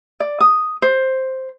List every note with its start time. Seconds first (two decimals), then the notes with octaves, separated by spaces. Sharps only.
0.20 D5
0.40 D#6
0.82 C5